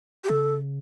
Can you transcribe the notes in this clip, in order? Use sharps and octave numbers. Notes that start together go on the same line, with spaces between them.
G4
C#3 A4